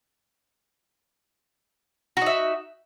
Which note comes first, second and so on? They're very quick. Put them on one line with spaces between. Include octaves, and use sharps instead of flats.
F#4 D#4 E5